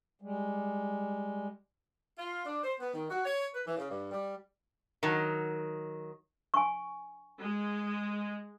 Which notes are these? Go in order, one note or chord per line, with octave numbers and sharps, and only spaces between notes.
G3 G#3
F4
D4
C5
B3
D#3
F#4
C#5
B4
E3
C#3
G2
G3
D#3 F#3
G#5 C#6
G#3